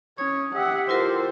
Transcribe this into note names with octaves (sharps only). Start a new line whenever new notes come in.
C#4 C#5 D#6
G4 E5 F#5
E4 F4 A4 A#4 C5